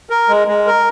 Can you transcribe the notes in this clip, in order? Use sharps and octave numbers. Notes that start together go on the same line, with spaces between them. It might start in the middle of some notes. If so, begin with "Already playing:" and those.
A#4
G#3
G#3
A#4